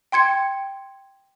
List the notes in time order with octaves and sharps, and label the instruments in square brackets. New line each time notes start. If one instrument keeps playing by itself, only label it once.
[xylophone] G5 C6 G#6 C#7